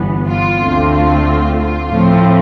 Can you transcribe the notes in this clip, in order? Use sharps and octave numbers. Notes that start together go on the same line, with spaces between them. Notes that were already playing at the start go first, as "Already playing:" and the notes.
Already playing: G1 G2 E3 B3
F4
D2 D3 A3 C4
F4
F4
A2 F3 A3 C4